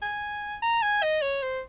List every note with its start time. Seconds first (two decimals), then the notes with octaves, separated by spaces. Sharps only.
0.02 G#5
0.62 A#5
0.82 G#5
1.03 D#5
1.22 C#5
1.42 C5